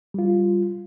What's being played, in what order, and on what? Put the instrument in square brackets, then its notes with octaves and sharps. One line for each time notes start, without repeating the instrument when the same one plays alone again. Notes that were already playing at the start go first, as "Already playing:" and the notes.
[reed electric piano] G3 F4